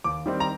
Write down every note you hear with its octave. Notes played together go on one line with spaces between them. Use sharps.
D#2 D6
D#3 G3 C4
A#5